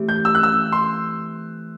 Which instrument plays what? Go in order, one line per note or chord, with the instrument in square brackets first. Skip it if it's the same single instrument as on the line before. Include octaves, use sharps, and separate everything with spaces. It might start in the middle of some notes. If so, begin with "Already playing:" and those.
Already playing: [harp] E3 A3 C4 G4
[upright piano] G6
E6
F#6
E6
C6